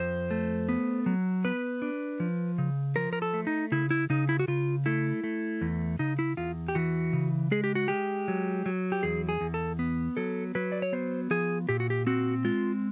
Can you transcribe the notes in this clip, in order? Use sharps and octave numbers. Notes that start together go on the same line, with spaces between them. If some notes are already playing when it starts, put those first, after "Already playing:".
Already playing: F2 C5
A3
B3
F#3
B3 B4
D4
F3
C#3
F3 A#4
A#4
A4
A3
D#4
C#3 E4
E4
C#3 D#4
E4
F#4
C#3 F4
A3 E4
A3
E2
C#3 D#4
E4
E2 F4
G4
E3 F#4
C#3
G#3 G#4
G4
F#4
G#3 G4
F#3
F#3
G4
E2 G#4
G#4
E2
A4
B3
F#3 A4
F#3 B4
D5
C#5
B3 C5
F3 G#4
A#2 G4
F#4
G4
C4 F#4
G#3 F4